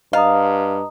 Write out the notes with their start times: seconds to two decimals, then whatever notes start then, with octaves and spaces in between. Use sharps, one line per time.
0.13 G2 D#5 F5 A#5 D#6